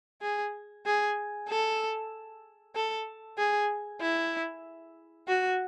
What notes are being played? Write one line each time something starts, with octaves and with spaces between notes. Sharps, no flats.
G#4
G#4
A4
A4
G#4
E4
F#4